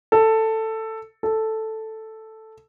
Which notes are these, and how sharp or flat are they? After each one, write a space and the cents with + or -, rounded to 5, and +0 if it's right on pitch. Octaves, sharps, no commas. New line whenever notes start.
A4 +10
A4 +0